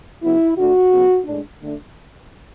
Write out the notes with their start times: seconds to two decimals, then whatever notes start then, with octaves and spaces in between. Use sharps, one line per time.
0.22 C#3 F#3 B3 E4
0.57 D3 A3 D4 F#4
0.91 C#3 F#3 B3
1.25 A2 G#3 D4
1.60 D3 A3 D4